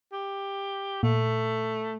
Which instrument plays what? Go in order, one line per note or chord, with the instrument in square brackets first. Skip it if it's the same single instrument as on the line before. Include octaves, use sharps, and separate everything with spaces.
[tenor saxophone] G4
[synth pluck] A#2 [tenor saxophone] A3